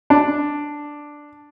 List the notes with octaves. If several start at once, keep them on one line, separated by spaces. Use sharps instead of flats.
D4